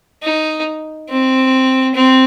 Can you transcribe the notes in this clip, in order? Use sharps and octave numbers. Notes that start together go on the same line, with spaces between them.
D#4
C4
C4